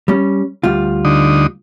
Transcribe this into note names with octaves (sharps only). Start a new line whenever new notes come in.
G3 C#4
D2 G3 F4
D3 D#4